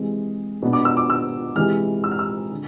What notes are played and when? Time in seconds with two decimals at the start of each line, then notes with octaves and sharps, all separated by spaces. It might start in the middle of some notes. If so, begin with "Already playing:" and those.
Already playing: C3 E3 G#3 C4
0.62 B2 B3 D4
0.73 D6
0.85 E6
0.97 D6
1.10 E6
1.56 C3 E3 G#3 F6
2.04 E6
2.11 F6
2.19 E6
2.52 D3